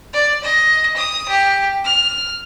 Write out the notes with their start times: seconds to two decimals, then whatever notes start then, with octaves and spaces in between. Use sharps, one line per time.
0.13 D5
0.43 D#5
0.96 D#6
1.28 G4
1.84 F6